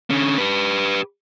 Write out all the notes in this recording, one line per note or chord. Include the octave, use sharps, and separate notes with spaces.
D3 C#4
G4 B4